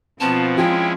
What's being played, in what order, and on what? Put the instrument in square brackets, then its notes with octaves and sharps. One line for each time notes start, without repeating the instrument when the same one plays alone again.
[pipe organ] B2 F3 B3 [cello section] C4 F4 [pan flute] A5
[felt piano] F3 [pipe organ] G#3 C#4 E4 [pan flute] G5